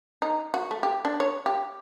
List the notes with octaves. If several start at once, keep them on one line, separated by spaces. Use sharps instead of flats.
D#4
F#4
A3
G4
D4
C#5
G4